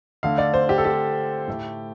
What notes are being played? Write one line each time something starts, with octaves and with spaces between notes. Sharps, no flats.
D3 A3 F5
D5
C5
G4
A4
G4
A2 A3